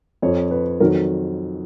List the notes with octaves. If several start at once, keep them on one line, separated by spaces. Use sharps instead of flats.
F2 F3 C#5
B4
F2 D#3 F#3 A#4